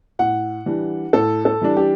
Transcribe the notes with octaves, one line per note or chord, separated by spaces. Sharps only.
A2 F#5
E3 G3 D4
A2 A4
A4
E3 G3 D4
G4